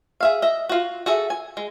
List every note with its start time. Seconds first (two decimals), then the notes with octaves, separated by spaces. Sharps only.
0.21 G#4 E5 F5
0.42 D#5 E5
0.69 F4 F#4
1.06 F#4 G#4 A4 E5
1.30 G#5
1.57 G#3